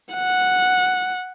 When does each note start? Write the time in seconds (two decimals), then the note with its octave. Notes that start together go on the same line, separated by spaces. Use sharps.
0.14 F#5